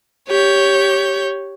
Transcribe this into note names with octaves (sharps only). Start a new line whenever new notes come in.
G4 C#5 G6